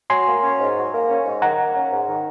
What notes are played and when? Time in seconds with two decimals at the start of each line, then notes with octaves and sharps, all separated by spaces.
0.10 F#3 G#5 C6
0.27 A#3
0.43 C#4
0.60 G#2
0.75 F#3
0.93 A#3
1.09 C#4
1.25 G#2
1.42 D#3 F#5 A#5
1.59 A#3
1.75 C#4
1.92 G#2
2.07 D#3